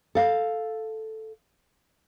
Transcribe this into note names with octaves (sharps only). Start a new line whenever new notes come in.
A4 F5